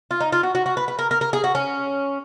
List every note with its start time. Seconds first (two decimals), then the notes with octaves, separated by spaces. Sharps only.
0.11 F4
0.20 D#4
0.32 F4
0.43 F#4
0.55 F#4
0.66 F#4
0.77 B4
0.88 B4
0.99 A#4
1.11 A#4
1.21 A#4
1.33 G#4
1.44 F#4
1.55 C#4